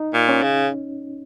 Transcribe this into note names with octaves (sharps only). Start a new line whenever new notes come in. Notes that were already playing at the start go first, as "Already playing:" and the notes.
Already playing: D#4
A#2
C#4
C#3